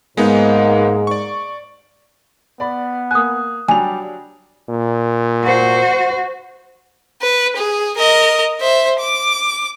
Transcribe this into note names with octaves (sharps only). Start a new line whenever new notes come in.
G#2 G#3 A#3 B3 D#4
D5 C#6
B3 D5 B5
A#3 G#5 D#6 F#6
F#3 G3 D4 G#5 F7
A#2
F#4 C5
B4
G#4
A#4 D#5
C5 E5
D6